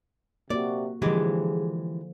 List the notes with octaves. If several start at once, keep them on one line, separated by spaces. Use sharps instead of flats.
C3 A#3 F#4 D5
D3 E3 F3 G#3 G4 G#4